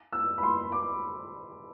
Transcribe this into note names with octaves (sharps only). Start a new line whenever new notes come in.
E6
B5
C6
D6